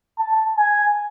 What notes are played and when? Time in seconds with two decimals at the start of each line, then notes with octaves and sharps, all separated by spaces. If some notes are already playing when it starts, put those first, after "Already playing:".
0.18 A5
0.58 G#5